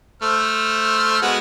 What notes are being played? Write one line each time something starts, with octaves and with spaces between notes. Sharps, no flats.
A3 C5 F6
G#3 B3 F#4